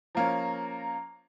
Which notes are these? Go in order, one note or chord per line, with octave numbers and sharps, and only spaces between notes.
F3 A#3 C#4 A#5